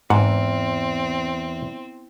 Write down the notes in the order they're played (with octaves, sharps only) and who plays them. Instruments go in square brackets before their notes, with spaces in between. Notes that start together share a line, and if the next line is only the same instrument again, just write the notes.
[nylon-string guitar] E2 [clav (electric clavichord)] G#2 F#5 [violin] C4